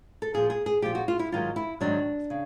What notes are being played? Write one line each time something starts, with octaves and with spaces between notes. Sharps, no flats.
A4
A#2 F3 G#4
G#4
G#4
A#2 F3 G4
F#4
F4
E4
G#2 D#3 F#3 F4
E4
G#2 D#3 F#3 D4
C#3